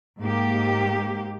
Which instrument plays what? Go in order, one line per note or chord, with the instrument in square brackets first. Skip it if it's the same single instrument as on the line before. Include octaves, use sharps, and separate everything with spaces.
[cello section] G#2 A#3 G4